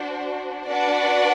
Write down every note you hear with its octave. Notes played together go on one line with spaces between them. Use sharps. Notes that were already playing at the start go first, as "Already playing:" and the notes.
Already playing: D4 F#4 C5
D4 F#4 B4 D5 F#5